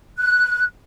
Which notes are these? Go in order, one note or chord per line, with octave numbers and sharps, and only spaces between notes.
F#6